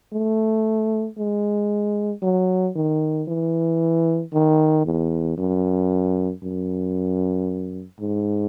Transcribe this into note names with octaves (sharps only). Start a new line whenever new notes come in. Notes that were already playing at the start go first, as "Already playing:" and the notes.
A3
G#3
F#3
D#3
E3
D#3
E2
F#2
F#2
G#2